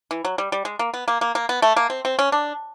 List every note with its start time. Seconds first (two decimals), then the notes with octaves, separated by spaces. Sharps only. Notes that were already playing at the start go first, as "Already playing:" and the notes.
0.11 E3
0.25 F#3
0.38 G3
0.52 G3
0.65 G#3
0.79 A#3
0.94 B3
1.08 A#3
1.21 A#3
1.35 A#3
1.49 B3
1.62 A3
1.76 A#3
1.90 C4
2.05 C4
2.19 C#4
2.32 D4